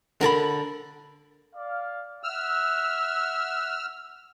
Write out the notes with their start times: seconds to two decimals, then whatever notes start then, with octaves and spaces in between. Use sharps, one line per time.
0.21 D3 A#4 A5 B5
1.55 D5 F5
2.23 E5 F#5 E6 F6